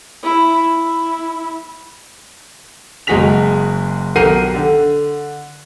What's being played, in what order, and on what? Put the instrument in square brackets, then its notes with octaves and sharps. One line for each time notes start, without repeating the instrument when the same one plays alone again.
[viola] E4
E4
[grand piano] F#1 G#3 F#4 G#4 B6 F7
B1 G4 A#4 F#5 C7 D#7
D3